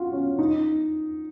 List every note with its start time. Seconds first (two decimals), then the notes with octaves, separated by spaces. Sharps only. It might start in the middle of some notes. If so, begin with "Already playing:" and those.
Already playing: F4 F#4
0.12 C#4
0.39 D#4